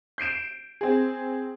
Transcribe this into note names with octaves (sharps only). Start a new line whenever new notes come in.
G6 C7 D7 E7
C4 G#4